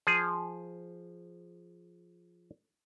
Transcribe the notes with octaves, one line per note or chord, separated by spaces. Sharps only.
F3 G#4